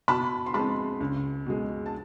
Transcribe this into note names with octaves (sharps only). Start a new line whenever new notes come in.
B2 A5 B5
C6
G#3 C4 A5 B5
C#2
B2 G#3
A5